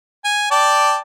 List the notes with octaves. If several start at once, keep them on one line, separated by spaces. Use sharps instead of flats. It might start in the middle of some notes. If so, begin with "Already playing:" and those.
G#5
D5 G5 A5